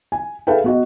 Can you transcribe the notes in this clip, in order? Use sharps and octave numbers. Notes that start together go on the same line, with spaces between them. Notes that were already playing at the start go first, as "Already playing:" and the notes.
G#5
G#4 A4 B4 E5 F5 G5
B3 F#4 D#5